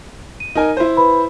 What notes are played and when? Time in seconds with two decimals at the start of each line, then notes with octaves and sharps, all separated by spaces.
0.40 D#7
0.55 D#4 A#4 G#5
0.77 E4 C5
0.97 B4 B5